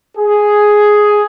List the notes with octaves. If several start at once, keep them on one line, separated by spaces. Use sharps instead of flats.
G#4